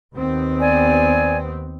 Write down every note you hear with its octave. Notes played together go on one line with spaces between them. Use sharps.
D#2 B3 C4
D5 G#5